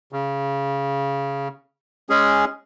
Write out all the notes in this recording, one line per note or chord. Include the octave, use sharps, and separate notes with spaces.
C#3
G#3 C#4 G#4